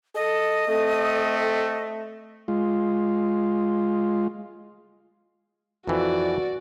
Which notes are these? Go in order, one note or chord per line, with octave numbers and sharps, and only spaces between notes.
A4 D#5
A3 C4 A4
G#3 F4
F2 E3 F#4 D5